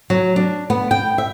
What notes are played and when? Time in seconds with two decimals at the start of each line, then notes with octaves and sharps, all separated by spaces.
0.10 F#3
0.36 D4
0.70 B3
0.91 G5
1.18 E5